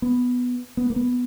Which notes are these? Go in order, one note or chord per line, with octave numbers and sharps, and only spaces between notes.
B3
B3
A#3
B3